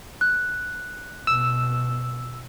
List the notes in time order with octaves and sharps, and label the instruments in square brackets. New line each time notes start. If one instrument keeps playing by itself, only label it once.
[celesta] F#6
[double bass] B2 [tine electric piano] E6